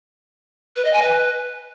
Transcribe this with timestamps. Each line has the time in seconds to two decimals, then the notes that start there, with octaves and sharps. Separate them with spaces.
0.76 B4
0.85 D#5
0.93 G#5
1.02 B4